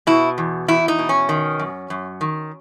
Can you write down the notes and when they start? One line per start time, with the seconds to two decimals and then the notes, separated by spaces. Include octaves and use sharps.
0.07 B2 E4
0.38 E2
0.68 E2 E4
0.88 D#4
0.99 B2
1.09 C#4
1.29 D#3
1.59 F#2
1.90 F#2
2.21 D#3